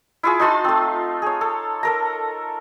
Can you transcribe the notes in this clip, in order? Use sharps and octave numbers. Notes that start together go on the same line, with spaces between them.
E4 F4 G#4
D#4 F4 A5 C6
A3 C4
G#4 C#5
A4
A4 A#4 A#5